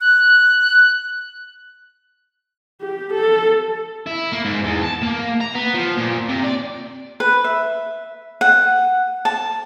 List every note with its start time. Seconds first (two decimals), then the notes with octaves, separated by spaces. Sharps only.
0.01 F#6
2.81 G4
3.13 A4
4.06 E4
4.32 A#3
4.45 G#2
4.64 E2
4.82 A5
5.02 A#3
5.41 A#5
5.55 B3
5.74 F3
5.98 A#2
6.29 C3
6.44 D5
7.20 B4
7.44 E5
8.41 F#5
9.25 A5